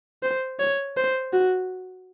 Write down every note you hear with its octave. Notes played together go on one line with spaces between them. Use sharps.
C5
C#5
C5
F#4